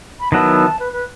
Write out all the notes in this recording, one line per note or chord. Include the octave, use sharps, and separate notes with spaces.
B5
D#3 F#3 B3 E4 A5
A5
B4
B4